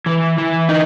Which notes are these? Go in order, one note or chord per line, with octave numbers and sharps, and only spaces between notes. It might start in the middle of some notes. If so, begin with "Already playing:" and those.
E3
E3
D#4